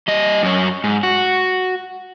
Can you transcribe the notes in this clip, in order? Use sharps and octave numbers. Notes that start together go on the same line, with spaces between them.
G3 D#5
F#2 C#5
G#2
F#4